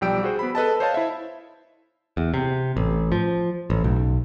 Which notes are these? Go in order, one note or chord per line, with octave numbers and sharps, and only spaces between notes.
B1 F3 G3 G5 E6 D7
F#4 G#4 C5
B3 B5
A4 B4 D#5 A5
C5 C#5 D#5 F5 A5
E4 E5
E2
C3
A1
F3
A1
B1